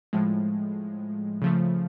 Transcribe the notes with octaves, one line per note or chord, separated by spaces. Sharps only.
A2 F3 G#3
C#3 F3 A3